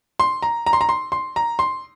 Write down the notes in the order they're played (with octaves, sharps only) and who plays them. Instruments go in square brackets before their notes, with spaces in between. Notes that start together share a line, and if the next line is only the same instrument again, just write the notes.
[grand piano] C6
A#5
A#5
C6
A#5
C6
C6
A#5
C6